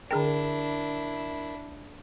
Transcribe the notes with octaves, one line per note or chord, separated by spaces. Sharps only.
D3 D4 E4 G#4 A#4 G5